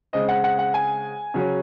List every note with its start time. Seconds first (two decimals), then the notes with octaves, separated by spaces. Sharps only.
0.13 C#3 G#3 C4 D#5
0.28 F#5
0.44 F#5
0.59 F#5
0.74 G#5
1.34 C#3 F#3 C#4